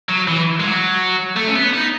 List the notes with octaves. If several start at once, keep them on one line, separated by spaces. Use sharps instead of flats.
F#3
E3
G#3
F#3
A3
C#4
B3
D#4